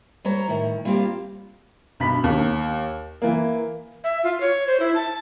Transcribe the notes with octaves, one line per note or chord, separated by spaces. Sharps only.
G3 C5 C#5 A#5
A2 D#3
G3 A#3 C4 F4 G4
B1 G2 B5 B6
D#2
E3 A#3
E5
F4
C#5
C5
E4
A5